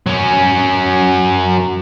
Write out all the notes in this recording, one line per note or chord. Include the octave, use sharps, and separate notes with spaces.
F#3 C#4